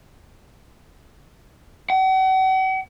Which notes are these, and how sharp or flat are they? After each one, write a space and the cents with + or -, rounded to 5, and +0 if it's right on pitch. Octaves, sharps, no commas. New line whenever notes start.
F#5 +40